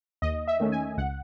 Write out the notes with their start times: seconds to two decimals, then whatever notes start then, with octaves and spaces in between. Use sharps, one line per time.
0.22 D#2 D#5
0.48 E5
0.60 D#3 A3 C#4
0.72 G#5
0.97 C#2 F#5